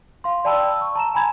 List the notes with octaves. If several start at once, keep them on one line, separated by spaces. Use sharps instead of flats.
F5 C6
D5 G5 A5 B5 E6
E6
C#6
A5 A#5 E7
G#5 A#5 B5 G#6